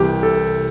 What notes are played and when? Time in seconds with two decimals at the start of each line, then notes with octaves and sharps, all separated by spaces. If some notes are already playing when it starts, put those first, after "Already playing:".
Already playing: C2 C3 E3 G4
0.23 A4